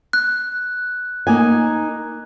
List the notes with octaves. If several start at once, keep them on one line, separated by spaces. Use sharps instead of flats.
F#6
A#3 D#4 G#5